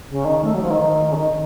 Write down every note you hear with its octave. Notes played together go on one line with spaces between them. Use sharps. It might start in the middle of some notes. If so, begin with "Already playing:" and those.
C#3
D#3
A3
F#3
F3
D#3
C#3
D#3